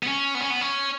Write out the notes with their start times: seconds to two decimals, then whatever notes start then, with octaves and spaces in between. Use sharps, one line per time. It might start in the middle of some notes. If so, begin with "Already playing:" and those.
0.03 B3
0.07 C#4
0.35 B3
0.42 C#4
0.50 B3
0.61 C#4